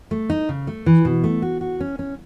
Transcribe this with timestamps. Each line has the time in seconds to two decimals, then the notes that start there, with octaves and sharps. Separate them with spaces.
0.11 A3
0.30 D#4
0.49 C#3
0.67 A3
0.86 E3
1.05 B2
1.24 A3
1.42 F#4
1.61 F#4
1.80 C#4
1.99 C#4